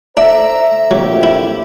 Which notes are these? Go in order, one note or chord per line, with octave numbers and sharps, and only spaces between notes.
D4 A4 C5 E5 A#5
A#1 F2 F#3 G4
E4